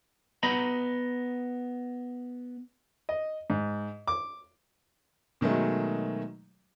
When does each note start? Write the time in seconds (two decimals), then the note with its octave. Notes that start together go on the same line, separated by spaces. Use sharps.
0.43 B3 D#5 A#5 B5
3.09 D#5
3.50 G#2
4.07 D6
5.41 B2 D#3 F#3 G#3 A3